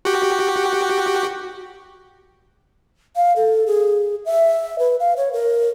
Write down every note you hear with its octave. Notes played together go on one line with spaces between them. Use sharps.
F#4 G4
F5
A4
G#4
E5
B4
F5
C#5
A#4